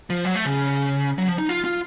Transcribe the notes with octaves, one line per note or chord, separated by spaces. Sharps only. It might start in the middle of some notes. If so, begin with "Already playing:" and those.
F3
F#3
A3
C#3
F#3
F3
D#4
F4
F4